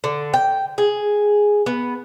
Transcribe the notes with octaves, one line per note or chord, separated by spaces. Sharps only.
D3
G5
G#4
B3